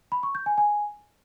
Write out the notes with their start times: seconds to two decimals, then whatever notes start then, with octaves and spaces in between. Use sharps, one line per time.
0.12 B5
0.23 C#6
0.35 G6
0.46 G#5
0.58 G#5